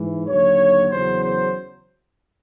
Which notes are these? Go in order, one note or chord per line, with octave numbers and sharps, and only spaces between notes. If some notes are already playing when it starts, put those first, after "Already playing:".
Already playing: G#2 E3
D#2 D3 F#3 C#5
E2 C#3 F#3 C5
C5